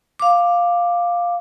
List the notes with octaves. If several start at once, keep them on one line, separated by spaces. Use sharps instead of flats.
F5 D6